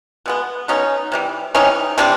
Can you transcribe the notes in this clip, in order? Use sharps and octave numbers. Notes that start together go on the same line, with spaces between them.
B2 G#3 B3
B2 G#3 B3 C#4 D#4
C3 E3 G3
C3 E3 G3 C#4 D#4
C3 E3 G3 C4 D4